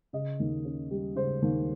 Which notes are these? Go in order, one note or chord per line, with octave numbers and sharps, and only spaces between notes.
C#3 D#5
D#2
C#4
G3
C#3 C5
D#2